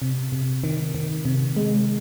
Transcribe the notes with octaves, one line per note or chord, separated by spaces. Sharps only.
C3
C3
D#3
D#3
C3
G#3